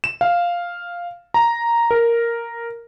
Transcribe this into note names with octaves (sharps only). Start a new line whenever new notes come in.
E7
F5
A#5
A#4